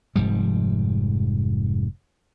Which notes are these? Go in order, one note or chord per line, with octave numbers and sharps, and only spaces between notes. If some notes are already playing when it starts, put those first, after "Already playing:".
F1 G#2 F3 G3